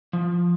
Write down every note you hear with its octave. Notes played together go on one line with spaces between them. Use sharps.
F3